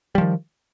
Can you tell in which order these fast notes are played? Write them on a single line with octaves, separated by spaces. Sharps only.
G3 F3 D#3